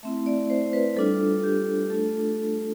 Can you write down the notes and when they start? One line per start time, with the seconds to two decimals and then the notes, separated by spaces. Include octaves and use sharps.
0.03 A3 C4 E4 E5
0.26 D5
0.50 C5
0.73 B4
0.96 G3 D4 F4 A4
1.44 G4
1.90 A3 D4 F4 A4